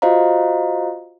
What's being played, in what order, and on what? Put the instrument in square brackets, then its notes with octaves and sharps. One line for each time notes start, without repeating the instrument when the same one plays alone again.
[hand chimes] F4 F#4 C5 D#5 F5 A#5